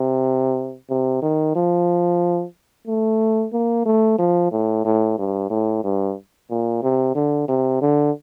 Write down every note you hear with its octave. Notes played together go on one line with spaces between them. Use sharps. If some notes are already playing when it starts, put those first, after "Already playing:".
Already playing: C3
C3
D#3
F3
A3
A#3
A3
F3
A2
A2
G2
A2
G2
A#2
C3
D3
C3
D3